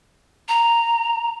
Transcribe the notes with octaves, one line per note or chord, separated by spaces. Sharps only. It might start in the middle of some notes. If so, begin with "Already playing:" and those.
A#5